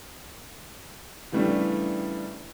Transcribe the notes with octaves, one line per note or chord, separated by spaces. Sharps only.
C#3 E3 G3 A3 D4